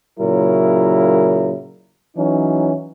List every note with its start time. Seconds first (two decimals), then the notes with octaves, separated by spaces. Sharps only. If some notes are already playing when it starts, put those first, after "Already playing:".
0.19 A#2 C#3 F#3 E4 A#4
2.17 E3 F#3 C#4 D#4